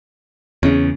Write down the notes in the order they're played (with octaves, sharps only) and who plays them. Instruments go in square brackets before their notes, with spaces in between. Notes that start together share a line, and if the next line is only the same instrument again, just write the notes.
[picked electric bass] E2 C#3 [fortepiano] C#4